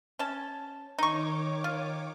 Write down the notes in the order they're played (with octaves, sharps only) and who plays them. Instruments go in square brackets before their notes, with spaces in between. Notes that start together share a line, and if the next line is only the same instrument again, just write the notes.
[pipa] C#4 A5
[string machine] D#3 C#5 D6 [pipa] D#4 C#6
[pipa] F4